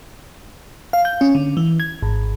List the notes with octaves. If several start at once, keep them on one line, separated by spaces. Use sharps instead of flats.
F5
G6
C#4
D3
E3
G#6
G#1